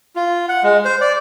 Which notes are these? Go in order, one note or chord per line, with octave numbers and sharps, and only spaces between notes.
F4
F#5
G#3
C5
D5